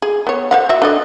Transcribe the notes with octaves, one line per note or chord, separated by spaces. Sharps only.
G#4
B3 C#5
C5 F5 F#5
F#4 E5
D4 A4 D#5